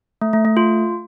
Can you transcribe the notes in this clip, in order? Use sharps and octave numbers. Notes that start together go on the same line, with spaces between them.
A3
A3
A3
F4